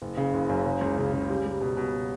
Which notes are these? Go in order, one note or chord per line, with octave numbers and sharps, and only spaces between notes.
F#1
C#3
F#1
F#2
C#3
C#2
C#3
C#3
G3
G3
B2
B2